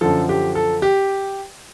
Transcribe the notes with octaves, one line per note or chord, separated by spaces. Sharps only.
F#2 D3 F3 A4
G4
A4
G4